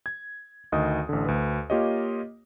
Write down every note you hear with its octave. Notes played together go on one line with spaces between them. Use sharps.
G#6
D2 D#3 D#5 D#6
A1 D3
D2 B4
A#3 F4 G4 C#5 D#5